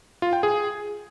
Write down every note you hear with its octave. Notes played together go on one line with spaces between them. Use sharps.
F4
G5
G#4